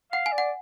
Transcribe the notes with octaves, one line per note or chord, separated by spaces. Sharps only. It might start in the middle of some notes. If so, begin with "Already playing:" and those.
F5 F#5
G#5
D5
F#5